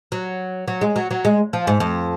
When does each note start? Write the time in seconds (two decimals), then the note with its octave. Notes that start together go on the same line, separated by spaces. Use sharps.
0.12 F#3
0.68 F#3
0.81 G#3
0.96 F#3
1.11 F#3
1.25 G#3
1.53 F3
1.67 G#2
1.80 F2